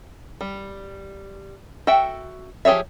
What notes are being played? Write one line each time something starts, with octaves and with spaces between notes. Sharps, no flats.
G3
F#4 A4 E5 G5
F3 G4 G#4 C#5 E5